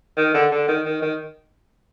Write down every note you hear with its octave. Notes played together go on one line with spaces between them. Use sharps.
D#3
D3
D3
D#3
D#3
D#3